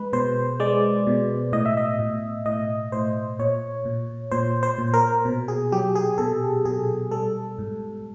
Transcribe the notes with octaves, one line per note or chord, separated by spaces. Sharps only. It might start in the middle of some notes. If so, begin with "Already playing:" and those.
Already playing: G#3 B4
B2 C5
G#3 D5
B2
A2 D#5
E5
D#5
A2
A2 D#5
A2 C5
A#2 C#5
A#2
A#2 C5
C5
A#2
A#4
B2
G#4
F#3 G4
G#4
B2 A4
B2 G#4
G3 A4
G#2